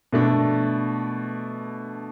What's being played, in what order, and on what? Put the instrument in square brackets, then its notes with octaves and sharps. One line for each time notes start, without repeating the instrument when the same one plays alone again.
[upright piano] B2 A3 D4